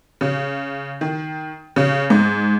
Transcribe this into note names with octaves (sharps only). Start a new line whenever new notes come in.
C#3
D#3
C#3
G#2